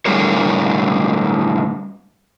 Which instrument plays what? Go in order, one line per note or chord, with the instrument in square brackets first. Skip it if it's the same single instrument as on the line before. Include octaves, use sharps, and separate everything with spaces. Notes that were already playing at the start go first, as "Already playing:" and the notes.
[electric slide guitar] A2 D3 G3 G#4 A#4 C#5